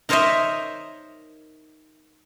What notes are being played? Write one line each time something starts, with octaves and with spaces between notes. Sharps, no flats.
D#4 A#4 C5 C#5 D#5 E5